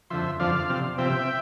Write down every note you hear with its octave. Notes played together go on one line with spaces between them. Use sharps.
F2 D3 F3 C5 E5
F2 D3 F3 D5 F5
C3 F3 C4
C3 F3 C4 E5 G5